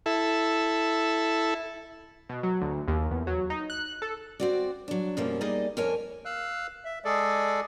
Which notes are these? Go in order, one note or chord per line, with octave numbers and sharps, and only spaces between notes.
E4 A4
B2
F#3
D2
D#2
E2
F#3
D#4
F#6
A4
C4 F#4 D5
F#3 D4
F#2 B2 F3 G3 A#3
G3 A#3 D#4 G#4 D5 D#5
F2 A#3 A#4 C#5 G#5 A5
F5 E6 F#6
E5
G#3 G#4 A4 D5